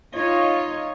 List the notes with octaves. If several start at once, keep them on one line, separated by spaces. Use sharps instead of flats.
D#4 F4 C#5 D#5